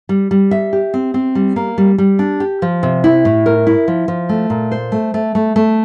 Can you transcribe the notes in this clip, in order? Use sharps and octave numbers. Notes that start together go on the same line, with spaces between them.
G3
G3
E5
G4
C4
C4
G3
A#3
G3
G3
D4
G4
F3
C3
E4
A2
A#4
E4
F3
F3
A3
A#2
C5
A3
A3
A3
A3